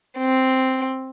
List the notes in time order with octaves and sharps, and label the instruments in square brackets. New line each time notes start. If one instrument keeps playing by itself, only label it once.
[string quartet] C4